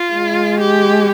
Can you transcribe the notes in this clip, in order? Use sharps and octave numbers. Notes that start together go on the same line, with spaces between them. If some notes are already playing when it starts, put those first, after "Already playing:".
Already playing: F4
G#3
G4